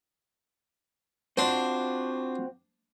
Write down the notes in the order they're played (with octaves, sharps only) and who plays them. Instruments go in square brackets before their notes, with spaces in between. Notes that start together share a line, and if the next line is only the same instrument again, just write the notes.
[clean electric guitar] C4 F4 F#4 [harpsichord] D4 C5